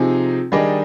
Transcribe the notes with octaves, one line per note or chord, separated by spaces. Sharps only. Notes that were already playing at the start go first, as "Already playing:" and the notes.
Already playing: C3 F3 C4 D#4 G#4
D#3 G3 D4 G#4 D#5